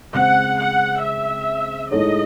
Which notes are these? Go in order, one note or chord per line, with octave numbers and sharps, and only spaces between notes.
C#3 G#3 C4 F#5
F#5
E5
A2 G#3 D#4 A4 C#5 D#5